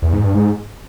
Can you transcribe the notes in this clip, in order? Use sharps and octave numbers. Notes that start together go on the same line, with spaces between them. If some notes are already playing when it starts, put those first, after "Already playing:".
E2
G#2
G2
G#2